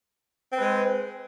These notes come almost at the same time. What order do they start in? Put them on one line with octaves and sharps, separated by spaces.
C4 B4 G#3 C5